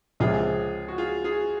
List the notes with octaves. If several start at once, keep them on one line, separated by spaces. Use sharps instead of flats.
C#2 C3 F3 F4 G#4
F#4
F4 G#4
F4 G#4